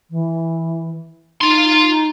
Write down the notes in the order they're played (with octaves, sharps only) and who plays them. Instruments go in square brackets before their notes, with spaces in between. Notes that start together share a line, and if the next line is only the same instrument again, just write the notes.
[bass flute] E3
[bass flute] D#4 [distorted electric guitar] F4 C6